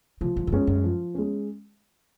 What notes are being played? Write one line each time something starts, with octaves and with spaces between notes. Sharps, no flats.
C3 F3
G#2
G#2
F#2 G#3 C#4
F#2
F3
G#3 C#4